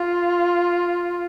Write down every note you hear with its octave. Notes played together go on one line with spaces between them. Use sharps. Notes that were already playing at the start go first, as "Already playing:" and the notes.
Already playing: F4